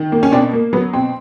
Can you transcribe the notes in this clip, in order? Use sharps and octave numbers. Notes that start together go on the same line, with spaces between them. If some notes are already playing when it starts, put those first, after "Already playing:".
Already playing: D#3
A#3
C#4
B2 C4 D4
A#3
F#3 B3
B2 C4